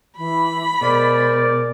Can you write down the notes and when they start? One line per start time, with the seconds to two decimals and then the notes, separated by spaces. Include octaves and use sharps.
0.17 E3 B5
0.81 B2 G#3 A#4 C5 D5